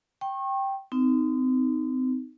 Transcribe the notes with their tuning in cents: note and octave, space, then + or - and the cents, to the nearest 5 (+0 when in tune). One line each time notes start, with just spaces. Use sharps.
G5 +0 C#6 -35
C4 -35 D#4 +0